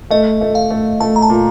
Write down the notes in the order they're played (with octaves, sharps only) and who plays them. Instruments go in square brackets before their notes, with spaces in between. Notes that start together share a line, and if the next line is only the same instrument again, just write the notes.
[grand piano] A3 [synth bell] D#5
[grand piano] A3
[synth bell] F5
[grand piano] A3
[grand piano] A3 [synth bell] A5
[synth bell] A#5
A5
[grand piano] A#2